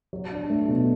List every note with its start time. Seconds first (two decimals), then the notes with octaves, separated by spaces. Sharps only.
0.13 F#3
0.31 D4
0.50 A3
0.68 B2